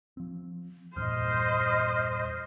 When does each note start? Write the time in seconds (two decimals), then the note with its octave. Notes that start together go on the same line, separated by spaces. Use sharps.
0.17 F3 C4
0.96 E2 G2 A#2 C5 D#5 F6